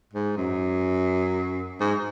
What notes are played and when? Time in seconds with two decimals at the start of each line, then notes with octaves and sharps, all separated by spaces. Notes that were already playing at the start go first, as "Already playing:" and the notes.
0.13 G#2
0.37 F#2
1.80 G#2